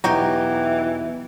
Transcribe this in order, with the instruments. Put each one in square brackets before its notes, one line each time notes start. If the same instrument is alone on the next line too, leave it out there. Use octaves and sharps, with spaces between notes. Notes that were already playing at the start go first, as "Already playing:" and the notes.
[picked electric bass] E2 B2 F#3 [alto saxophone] E3 [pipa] D#4 F#4 G4